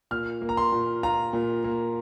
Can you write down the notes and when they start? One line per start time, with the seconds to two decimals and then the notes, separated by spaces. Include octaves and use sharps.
0.11 A#2 F6
0.42 A#3
0.49 A#5
0.57 C6
0.72 A#2
1.03 F4 A#5
1.33 A#2
1.64 A#3